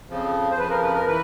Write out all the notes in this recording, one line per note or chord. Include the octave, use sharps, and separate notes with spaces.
F2 C#3 F3
C5
F2 C#3 F3 B4
A#4
B4
A#4
E3 B4